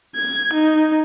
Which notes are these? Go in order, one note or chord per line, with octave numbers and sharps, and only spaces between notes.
G#6
D#4